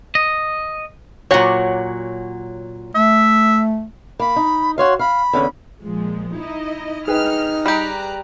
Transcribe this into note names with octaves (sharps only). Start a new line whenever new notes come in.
D#5
A#2 F#3 C#5 F#5
A3 E5
A#3 B5
D#4
F#4 C#5 F5 C6
F5 B5
E2 D3 C#4
A#2 F3 G#3
D#4 E4 D#5
D#4 G#4 B4 G5 F6
G3 G4 A#5 F#6